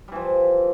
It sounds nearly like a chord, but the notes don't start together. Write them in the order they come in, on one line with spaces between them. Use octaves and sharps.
G3 E3 F3